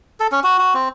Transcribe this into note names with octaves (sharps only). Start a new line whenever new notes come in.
A4
C#4
F#4
F#4
C4